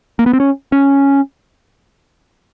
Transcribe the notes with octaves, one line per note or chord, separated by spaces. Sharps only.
A#3
B3
C4
C#4
C#4